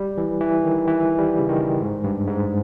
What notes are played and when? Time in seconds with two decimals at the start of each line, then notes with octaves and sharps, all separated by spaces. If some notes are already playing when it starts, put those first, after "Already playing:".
Already playing: G3
0.18 E3
0.40 E3
0.64 D#3
0.88 E3
1.18 G3
1.39 C#3
1.49 D#3
1.81 G#2
2.04 G2
2.28 G#2